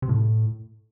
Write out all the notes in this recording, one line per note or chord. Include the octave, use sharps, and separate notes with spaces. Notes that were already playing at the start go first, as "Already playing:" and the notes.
C3
A2